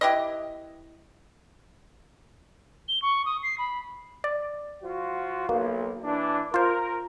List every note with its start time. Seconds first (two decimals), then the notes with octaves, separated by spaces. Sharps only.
0.01 E4 G4 B4 D#5
2.88 G7
3.02 C#6
3.26 D#6
3.43 C7
3.58 B5
4.24 D5
4.83 F3 F4 F#4
5.49 B1 A#3
6.04 E3 D4
6.54 F4 A#4 C5